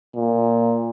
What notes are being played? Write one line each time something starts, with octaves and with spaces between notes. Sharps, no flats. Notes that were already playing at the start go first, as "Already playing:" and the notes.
A#2